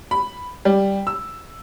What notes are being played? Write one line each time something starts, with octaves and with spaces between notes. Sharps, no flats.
B5
G3
E6